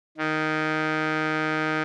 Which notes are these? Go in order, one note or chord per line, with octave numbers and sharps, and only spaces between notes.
D#3